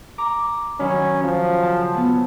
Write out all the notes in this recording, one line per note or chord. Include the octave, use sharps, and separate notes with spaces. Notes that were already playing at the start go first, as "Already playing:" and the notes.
A#5 D6
D#3 F#3 C#4 B5
F3
C#3 A5
F#3 B3